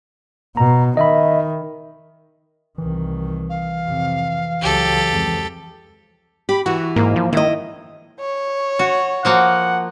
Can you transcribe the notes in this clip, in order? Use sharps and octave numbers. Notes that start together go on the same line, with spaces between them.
B2 A#5
D#3 D#5 E5 B5
C2 D#3 E3
F5
F2 C3
C#2 F#3 G4 A4
F2 G#3
G4 B5
E3 F#4
G#2 A#3
F3
D#3 E4 D#5
C#5
F#4
F3 A#3 F#4 F#5